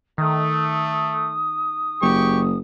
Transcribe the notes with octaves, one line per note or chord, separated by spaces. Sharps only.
D#3 A3 D#6
F#1 G4 C#6